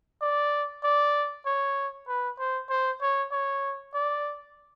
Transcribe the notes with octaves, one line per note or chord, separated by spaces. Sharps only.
D5
D5
C#5
B4
C5
C5
C#5
C#5
D5